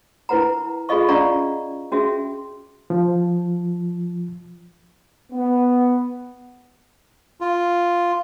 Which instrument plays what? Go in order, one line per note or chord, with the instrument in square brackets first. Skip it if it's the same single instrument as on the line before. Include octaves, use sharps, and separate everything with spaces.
[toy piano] E4 A#4 B4 F#5 A#5
F4 G#4 A4 D#5 F5 C#6
C#4 D5 F5 F#5 A#5 C#6
C#4 F#4 G#4 E5
[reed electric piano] F3
[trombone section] B3
[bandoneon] F4